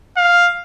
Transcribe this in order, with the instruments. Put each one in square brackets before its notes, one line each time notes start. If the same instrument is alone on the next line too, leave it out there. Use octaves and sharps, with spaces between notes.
[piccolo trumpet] F5